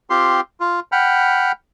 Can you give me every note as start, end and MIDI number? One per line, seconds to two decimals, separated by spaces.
0.10 0.41 60
0.10 0.41 65
0.10 0.41 67
0.10 0.41 84
0.60 0.80 65
0.92 1.52 78
0.92 1.52 79
0.92 1.52 83
0.92 1.52 89